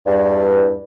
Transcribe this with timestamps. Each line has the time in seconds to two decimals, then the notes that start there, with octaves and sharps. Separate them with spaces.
0.06 E2 G2